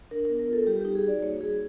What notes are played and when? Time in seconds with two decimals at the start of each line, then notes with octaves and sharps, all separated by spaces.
0.11 D4 A#4
0.25 A#4
0.29 B3
0.39 A#4
0.48 F4 A4
0.67 G3 G4
0.81 G4
0.85 D#4
0.95 G#4
1.03 F#4 D5
1.22 A#3 C#5
1.40 G3 G#4